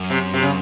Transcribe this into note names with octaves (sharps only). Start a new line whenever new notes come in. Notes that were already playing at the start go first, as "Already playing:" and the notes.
Already playing: F#2
C3
C3
C#3